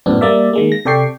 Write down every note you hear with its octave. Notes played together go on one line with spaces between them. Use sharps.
F#2 A2 B3 C4 D4
G3 A#3 D5 E5
D#3 G#3 A#3
A#6
C3 A4 D5 G5 C#6 C7